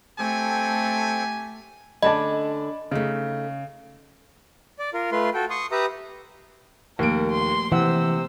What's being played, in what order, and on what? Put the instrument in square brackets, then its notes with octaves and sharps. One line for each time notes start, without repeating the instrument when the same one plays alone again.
[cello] A3 [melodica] C4 A4 G5 [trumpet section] G4 G#5
[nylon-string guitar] D3 A3 C#4 [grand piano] D5 A5 B5 [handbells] D#5
[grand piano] C#3 [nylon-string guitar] A3 D#4
[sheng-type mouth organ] D5
F4 A#4
A3 F4 B4 C6
F#4 A4 G5
C6 C#6 D#6
G4 B4 E5 A#5 D#6
[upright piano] D#2 D7 [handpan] F3 A3 A#3 [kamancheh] A#4
[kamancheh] C6
[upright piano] C3 F#5 [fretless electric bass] E3 [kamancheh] C5 E6